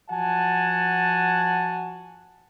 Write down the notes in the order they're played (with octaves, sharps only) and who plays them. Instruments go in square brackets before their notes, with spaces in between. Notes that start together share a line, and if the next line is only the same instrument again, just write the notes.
[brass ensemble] F3 F#4 F#5 G#5 A5